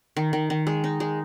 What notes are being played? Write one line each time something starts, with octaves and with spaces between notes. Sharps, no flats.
D#3
D#3
D#3
G#3
D#4
G#3